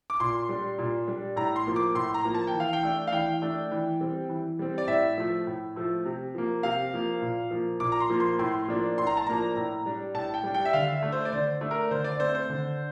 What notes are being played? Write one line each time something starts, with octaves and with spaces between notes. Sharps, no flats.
D6
A#2 C6
G3 D4
A#2
G3 D4
A2 A#5
C6
F3 A#3
D6
A2 C6
A#5
F3 A#3
A5
G5
E3
F5
G5
A3 D4
F5
E3 G5
A3 D4
E3
G3 C4
E3
G3 C4
D5
A2 E5
F3 A3
A2
F3 A3
C3
F3 A#3
C3 F5
F3 A#3
A#2
F3 A#3
A#2 D6
A#5
C6
F3 A#3
C6
A2 C6
F3 A#3 D4
A2 C6
A#5
A5
F3 A#3 D4 A#5
A2
G3 D4
A2 A5
G5
G3 D4
G5
E5
D3 F5
E5
A3 D4
C5
D5
D3 C5
A3 D4
A#4
D3 C5
D5
A3 C4 C5
C5
D3